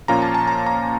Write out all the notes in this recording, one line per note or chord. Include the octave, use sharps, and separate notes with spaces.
A#2 F3 A#3 C#4 F4 A#5
A5
A5
A#5
A#5